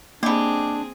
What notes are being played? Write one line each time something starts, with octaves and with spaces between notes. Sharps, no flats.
G3 A#3 C4 D4 G4 G#4